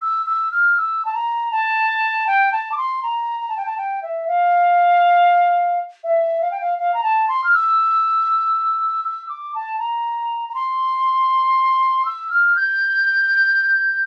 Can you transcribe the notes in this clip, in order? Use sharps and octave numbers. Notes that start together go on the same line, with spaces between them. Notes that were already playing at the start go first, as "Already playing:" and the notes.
E6
E6
F6
E6
A5
A#5
A5
G5
A5
D6
C6
A#5
A#5
A5
G5
A5
G5
E5
F5
E5
F5
G5
F5
F5
A#5
A5
C6
F6
E6
E6
D6
A5
A#5
A#5
C6
E6
F6
G6